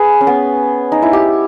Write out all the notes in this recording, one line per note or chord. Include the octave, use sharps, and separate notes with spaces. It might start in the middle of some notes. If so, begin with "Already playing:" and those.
Already playing: G#4 B4
C#4
B3
D#4
E4
G4